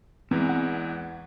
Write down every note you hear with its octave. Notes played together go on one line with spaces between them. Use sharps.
E2 E3 G#3 C4
F#5